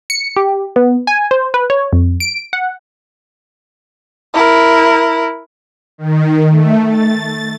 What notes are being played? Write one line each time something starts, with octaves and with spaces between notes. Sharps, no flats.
C#7
G4
B3
G#5
C5
B4
C#5
F2
D7
F#5
E4 A#4
D#3
A3
A6